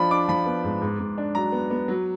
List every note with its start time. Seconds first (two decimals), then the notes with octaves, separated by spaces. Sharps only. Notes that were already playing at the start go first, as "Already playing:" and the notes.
Already playing: F3 D4 B5
0.11 D4 D6
0.28 F3 B5
0.46 B3
0.64 G#2
0.82 G#2
0.99 G#2
1.18 D4
1.35 F#3 A#5
1.52 B3
1.70 B3
1.88 F#3